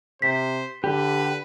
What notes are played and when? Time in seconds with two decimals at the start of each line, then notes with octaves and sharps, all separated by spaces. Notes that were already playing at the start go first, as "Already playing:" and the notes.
0.22 C3 C5 B6
0.84 D3 G4 B4